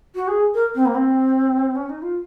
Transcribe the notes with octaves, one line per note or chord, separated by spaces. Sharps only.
F#4
G#4
A#4
C4
A#3
C4
C#4
D#4
F4